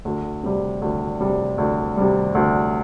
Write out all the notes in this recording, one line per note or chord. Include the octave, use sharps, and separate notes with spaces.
D2
C3 G3
D2
C3 G3
D2
C3 G3
D2